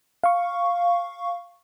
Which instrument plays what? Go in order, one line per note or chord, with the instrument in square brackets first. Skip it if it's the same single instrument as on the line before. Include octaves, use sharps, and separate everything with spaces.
[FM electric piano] F5 C#6